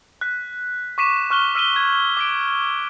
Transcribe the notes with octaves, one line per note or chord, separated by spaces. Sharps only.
F#6 B6
C#6 D6 B6 D#7 E7
C#6 F6 F#6 G7
E6 F6 B6 D#7 E7 G7
G#6
D6 B6 D7